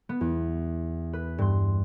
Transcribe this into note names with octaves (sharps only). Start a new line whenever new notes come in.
B3
E2
B4
G2 C6